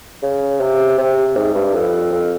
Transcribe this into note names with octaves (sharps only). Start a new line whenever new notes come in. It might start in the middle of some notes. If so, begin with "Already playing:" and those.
C#3
C3
C3
G#2
G2
F2
F2